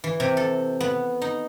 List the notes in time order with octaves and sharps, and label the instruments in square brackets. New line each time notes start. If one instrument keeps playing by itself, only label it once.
[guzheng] E3
C3
A4
B3
D#4